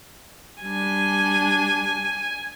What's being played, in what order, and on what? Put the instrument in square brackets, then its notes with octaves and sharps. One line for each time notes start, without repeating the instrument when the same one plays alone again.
[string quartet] G3 D4 [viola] G#5